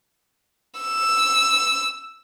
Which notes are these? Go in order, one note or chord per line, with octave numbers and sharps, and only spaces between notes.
E6